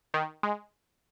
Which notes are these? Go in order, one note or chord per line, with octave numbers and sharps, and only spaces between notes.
D#3
G#3